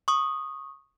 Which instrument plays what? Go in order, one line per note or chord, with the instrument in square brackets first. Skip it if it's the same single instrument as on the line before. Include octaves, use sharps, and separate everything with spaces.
[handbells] C#6 D#6